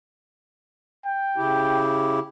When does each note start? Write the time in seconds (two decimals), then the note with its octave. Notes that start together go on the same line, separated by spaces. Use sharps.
1.05 G5
1.37 C#3 E4 G4